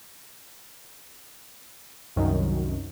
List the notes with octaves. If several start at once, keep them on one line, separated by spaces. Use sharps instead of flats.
C2 F#2 D#3